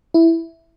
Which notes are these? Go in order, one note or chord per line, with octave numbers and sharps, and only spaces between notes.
E4